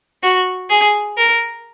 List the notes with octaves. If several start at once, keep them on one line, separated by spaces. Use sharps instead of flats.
F#4
G#4
A#4